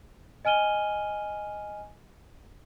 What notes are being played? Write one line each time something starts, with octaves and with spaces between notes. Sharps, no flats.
D#5 G#5 F6 D#7 G7